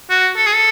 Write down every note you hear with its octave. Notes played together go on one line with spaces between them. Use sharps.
F#4
A4
G#4
A4